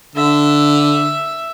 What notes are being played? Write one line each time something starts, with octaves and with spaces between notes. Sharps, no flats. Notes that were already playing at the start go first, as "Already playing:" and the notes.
D3 E5